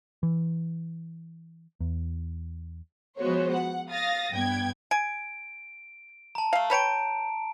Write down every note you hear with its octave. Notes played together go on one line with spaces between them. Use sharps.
E3
E2
F3 G#3 B3 F#4 C5 C#5
F#5
F5 D#6 A6 A#6
G2 B3 G5 G#6
G#5 D7
A5 A#5
A3 F5
B4 C#5 G5 A5 A#5 D7